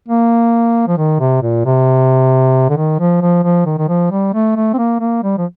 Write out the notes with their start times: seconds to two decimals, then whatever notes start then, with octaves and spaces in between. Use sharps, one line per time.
0.08 A#3
0.88 F3
0.97 D#3
1.20 C3
1.42 A#2
1.65 C3
2.70 D3
2.77 D#3
3.00 F3
3.22 F3
3.44 F3
3.66 D#3
3.78 D#3
3.89 F3
4.11 G3
4.34 A3
4.56 A3
4.74 C4
4.78 A#3
5.00 A#3
5.23 G3
5.38 F3